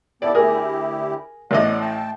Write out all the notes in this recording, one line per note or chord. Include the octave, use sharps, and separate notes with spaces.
B3 E4 G4 A4 D5
D2 E4 G4 G#4 A#4
A1 A2 D5 D#5 F#5
A3 G5 A5